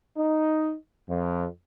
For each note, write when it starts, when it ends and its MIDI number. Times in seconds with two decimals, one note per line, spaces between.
0.18 0.74 63
1.09 1.47 41